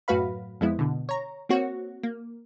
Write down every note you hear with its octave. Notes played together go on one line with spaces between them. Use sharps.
F#2 A2 F#4 B4 F5 B5
F2 G#3 B3 E4
B2 D3
C#5 A#5
A#3 C4 F#4 C#5
A#3